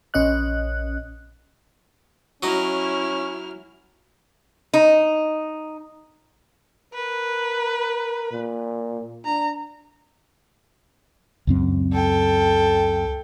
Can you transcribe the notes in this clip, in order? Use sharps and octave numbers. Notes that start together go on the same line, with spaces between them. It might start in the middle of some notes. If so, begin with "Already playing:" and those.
A#1 C#4 D#5 F#6
F#3 C#4 E4 D#5 F6
D#4
A#4 B4
A#2
D4 A#5
C#2 F#2 C4
A4 G5